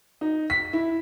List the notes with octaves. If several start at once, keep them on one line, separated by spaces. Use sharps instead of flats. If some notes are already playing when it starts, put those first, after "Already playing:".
D#4
B6
E4